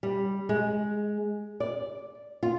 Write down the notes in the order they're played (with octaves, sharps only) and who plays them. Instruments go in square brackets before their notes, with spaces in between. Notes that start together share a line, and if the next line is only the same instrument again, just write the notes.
[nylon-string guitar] G3
G#3
D5
F4